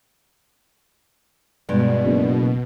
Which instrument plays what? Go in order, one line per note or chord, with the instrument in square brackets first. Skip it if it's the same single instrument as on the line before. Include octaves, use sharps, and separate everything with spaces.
[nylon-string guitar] G2 G#3 D5 [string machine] B2
[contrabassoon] F#1